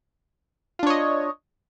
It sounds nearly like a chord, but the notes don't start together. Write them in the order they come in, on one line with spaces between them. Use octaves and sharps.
F4 D4 C#5 D#5